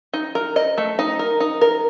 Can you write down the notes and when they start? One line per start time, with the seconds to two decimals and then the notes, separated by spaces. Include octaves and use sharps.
0.13 D#4
0.35 A#4
0.56 D#5
0.78 A3
0.99 D#4
1.19 A#4
1.40 D#4
1.61 A#4